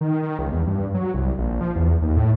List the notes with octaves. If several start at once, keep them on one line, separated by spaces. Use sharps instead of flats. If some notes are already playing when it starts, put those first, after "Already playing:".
D#3
D#3
C#2
E2
G2
F#3
C2
A#1
F3
E2
D#2
A2